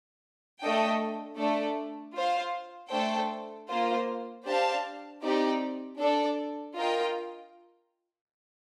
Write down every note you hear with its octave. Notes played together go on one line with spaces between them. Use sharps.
A3 D4 A4 D#5 G5
A3 D4 A4 D5
F4 C5 F5
A3 D4 A4 C5 G5
A#3 F4 C5
D4 G4 C5 F5 A5
C4 D#4 G4 D5
D4 A4 D5
F4 A#4 D#5 G5